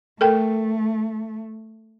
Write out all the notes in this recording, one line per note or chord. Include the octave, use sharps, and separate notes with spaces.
A3 A4 A#4 G5